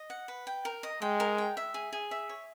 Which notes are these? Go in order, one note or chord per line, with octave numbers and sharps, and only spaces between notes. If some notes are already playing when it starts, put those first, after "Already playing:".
Already playing: D#5
F#5
B4
G5
A#4
D#5
G#3 G5
A#4
G5
E5
G#4
G#4
E5
C#5